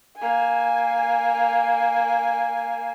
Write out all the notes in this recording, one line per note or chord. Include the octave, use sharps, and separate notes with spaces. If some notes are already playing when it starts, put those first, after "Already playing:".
A#3 G#5